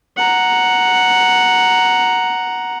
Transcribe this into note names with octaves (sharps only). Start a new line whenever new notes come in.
F#5 A#5